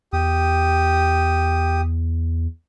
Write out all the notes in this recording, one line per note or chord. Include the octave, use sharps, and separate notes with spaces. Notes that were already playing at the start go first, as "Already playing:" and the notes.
E2 G4 D#6